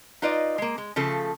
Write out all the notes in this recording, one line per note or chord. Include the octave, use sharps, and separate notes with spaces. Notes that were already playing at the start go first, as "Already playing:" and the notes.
D#4 F4 B4 D5 D#5
G#3 A#3
G#3
C#3 F3 A3 A4